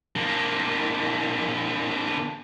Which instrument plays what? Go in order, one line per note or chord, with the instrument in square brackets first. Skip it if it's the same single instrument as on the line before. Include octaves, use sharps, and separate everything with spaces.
[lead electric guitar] D3 A#3